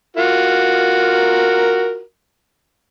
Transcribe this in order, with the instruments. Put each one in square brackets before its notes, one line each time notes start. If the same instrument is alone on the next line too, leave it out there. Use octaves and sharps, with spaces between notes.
[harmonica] F4 F#4 A#4